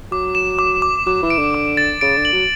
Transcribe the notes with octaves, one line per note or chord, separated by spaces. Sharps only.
F#3 D6
E7
D6
D6
F#3 D6
E3
D7
D3
D6
A6
C#3 D7
D3
F#7
F#3